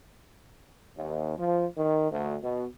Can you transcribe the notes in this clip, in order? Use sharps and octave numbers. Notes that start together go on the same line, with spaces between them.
D#2
F3
D#3
D2
B2